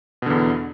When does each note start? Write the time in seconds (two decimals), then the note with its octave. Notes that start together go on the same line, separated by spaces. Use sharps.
0.22 B2
0.26 D3
0.30 E2